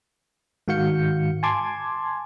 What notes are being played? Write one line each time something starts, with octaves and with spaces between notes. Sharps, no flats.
G#2 D#3 F#4 F5 G6 C#7
G#5 A5 C6 D6 G#6